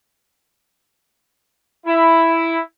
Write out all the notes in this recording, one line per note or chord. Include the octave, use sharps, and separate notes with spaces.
E4